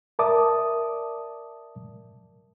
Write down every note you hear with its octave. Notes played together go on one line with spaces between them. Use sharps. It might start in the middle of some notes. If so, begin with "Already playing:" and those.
A#4 D5 E5 A5 D6 D#6